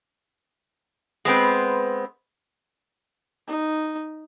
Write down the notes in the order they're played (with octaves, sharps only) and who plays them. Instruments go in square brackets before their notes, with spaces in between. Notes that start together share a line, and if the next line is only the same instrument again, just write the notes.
[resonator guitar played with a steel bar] G#3 B3 C4 B4
[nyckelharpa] D#4